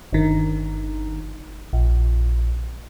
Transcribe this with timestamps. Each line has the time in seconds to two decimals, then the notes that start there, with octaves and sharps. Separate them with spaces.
0.13 G1 D#3
1.73 A#1